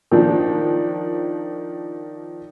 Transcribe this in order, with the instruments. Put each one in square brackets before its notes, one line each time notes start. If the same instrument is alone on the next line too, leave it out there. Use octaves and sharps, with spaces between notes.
[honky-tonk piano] D#3 F3 D4